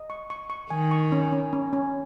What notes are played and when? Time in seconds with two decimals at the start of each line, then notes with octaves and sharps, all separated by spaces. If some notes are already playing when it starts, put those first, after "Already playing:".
Already playing: D#5
0.10 C#6
0.30 C#6
0.50 C#6
0.70 D#3 G#5
0.91 C#6
1.12 C#4
1.32 C#4
1.53 C#4
1.73 C#4